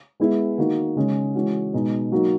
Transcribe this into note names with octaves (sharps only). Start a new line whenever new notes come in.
G#3 B3 E4 G#4
D#3 A#3 D#4 F#4
C#3 G#3 C#4
E3 G#3 C#4 F#4
B2 G#3 D#4
F#3 A#3 D#4 F#4